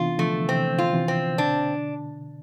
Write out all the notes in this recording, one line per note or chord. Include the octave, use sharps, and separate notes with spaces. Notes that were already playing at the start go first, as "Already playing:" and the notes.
Already playing: C3 E3 B3 D4 F4
D3 F3 A3
C3 E3 C4
F4
C3 E3
C4
B2 D3 D4